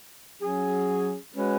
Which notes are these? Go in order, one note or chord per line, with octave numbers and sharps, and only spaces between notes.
F#3 C#4 G#4
G#3 C#4 F#4 B4